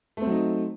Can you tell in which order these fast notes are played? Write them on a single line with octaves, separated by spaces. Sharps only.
A3 C4 F#3 D#4